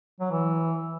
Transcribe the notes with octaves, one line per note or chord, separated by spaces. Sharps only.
F#3
E3